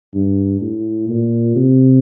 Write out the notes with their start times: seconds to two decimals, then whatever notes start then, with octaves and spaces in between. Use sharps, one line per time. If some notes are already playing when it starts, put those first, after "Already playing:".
0.14 G2
0.61 A2
1.08 A#2
1.56 C3